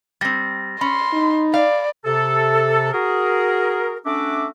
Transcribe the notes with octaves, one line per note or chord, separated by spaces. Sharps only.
G3 C4 A6 A#6
C#4 B5 C6
D#4
D5 F5
C3 A4
F#4 G#4 A#4
A3 C#4 D4 F#4 E5 D6